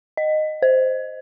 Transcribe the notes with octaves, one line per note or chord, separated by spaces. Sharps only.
D#5
C5